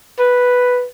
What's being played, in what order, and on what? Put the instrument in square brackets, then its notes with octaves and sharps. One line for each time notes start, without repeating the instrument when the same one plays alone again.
[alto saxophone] B4